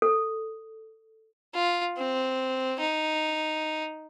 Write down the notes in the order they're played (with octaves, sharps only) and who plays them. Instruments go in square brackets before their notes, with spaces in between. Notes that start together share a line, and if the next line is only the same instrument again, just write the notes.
[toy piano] A4
[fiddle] F4
C4
D#4